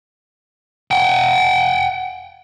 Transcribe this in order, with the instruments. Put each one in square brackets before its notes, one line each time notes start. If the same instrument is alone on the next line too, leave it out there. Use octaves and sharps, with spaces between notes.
[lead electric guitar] F#5 G5